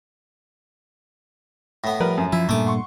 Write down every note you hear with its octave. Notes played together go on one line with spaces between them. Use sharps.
A2 B3
F3 G3 A#4 B4
F#2
F3 E4
G2 A#2 A3 D6
F#5 C6 C#6